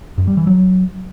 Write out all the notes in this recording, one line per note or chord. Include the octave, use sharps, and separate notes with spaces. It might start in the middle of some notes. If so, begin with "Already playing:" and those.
F#2
G3
E3
F#3